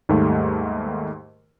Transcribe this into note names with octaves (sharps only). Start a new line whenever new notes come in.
D#2 G#2 G3 A3